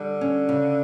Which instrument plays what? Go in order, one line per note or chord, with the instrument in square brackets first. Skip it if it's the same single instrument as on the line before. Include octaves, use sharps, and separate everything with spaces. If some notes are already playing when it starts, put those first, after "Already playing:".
Already playing: [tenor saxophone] D3 [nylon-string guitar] G3
[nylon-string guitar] C#4
C#3